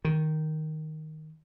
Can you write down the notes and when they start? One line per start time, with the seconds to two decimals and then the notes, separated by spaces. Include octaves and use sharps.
0.05 D#3